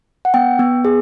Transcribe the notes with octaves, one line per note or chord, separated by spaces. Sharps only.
F#5
B3 G5
B3
G#4